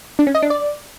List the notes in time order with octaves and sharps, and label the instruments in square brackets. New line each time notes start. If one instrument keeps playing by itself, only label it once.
[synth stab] D4
C#4
D#5
D4
D5